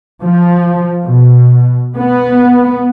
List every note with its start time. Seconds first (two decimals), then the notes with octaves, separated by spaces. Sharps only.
0.23 F3
1.05 B2
1.97 B3